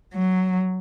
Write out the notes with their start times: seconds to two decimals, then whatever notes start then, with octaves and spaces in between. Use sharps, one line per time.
0.14 F#3